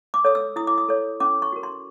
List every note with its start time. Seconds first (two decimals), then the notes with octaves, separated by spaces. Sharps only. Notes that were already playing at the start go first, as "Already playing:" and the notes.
0.14 D6
0.25 A4 C#5 D#6
0.35 E6
0.56 E4 D#6
0.67 D6
0.78 D#6
0.89 A4 C#5
1.20 C#4 D6
1.42 C#6
1.52 F#4 A#4
1.63 C6